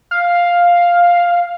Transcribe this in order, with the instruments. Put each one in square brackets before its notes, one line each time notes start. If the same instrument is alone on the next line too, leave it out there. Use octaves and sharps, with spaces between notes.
[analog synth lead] F5